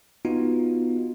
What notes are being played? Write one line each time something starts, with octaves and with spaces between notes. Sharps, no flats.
B3 D#4 F4 F#4